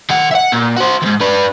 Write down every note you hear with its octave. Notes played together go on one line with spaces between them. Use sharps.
D#3 F#5
E5 F#5
A#2
F#4 C5
D#2 G#2
D4 B4